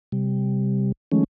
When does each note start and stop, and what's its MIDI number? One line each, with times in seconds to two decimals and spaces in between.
0.12 0.92 48
0.12 0.92 55
1.12 1.24 51
1.12 1.24 53
1.12 1.24 56
1.12 1.24 57
1.12 1.24 61